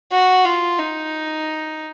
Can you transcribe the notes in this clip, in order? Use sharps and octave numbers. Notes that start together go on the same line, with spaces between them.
F#4
F4
D#4